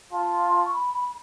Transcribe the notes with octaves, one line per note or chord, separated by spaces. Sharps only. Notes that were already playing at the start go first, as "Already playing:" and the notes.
F4 A5
C#6
B5
B5